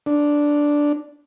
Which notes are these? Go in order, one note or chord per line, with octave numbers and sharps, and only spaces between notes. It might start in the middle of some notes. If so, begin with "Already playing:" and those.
D4